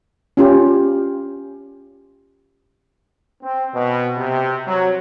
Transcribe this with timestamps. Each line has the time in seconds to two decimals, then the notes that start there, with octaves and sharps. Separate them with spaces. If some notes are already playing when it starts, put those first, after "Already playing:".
0.37 C#4 F4 G4
3.42 C4
3.74 B2
4.17 C3
4.66 F#3